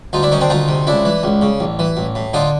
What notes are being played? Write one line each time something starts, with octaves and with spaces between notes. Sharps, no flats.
D2 D#4 F4
D4 E4
D#3 C#4 D#4
C4 D4
D2 D#4 F4
C3
C#2 D4 E4
E3
C#2
C#3
A1
E3
A1
A2
D3 D#4 F4